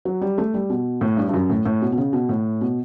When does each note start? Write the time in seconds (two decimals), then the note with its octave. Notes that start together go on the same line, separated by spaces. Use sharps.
0.05 F#3
0.21 G3
0.38 A3
0.54 G3
0.70 B2
1.01 A2
1.17 G2
1.29 G2
1.34 F#2
1.50 A2
1.66 A2
1.82 B2
1.92 B2
1.97 C#3
2.13 B2
2.29 A2
2.61 B2